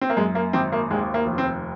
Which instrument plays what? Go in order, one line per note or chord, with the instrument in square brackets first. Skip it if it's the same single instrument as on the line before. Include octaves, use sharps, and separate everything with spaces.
[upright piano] C4
A#3
F#2 G#3
A#3
G#1 C4
A#3
D#2 G#3
A#3
F1
C4